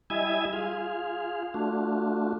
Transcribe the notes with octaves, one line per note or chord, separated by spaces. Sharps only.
G3 E4 D#5 E5 G#5 G#6
F4 G#4 F5
A3 D4 F4 F#4